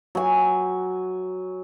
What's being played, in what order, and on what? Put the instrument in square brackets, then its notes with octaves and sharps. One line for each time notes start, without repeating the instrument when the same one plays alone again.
[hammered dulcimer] F#3 G#5